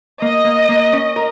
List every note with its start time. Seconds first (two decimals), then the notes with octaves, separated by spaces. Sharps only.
0.21 A#3 D#5
0.45 A#3
0.69 A#3
0.93 C#4
1.16 A#4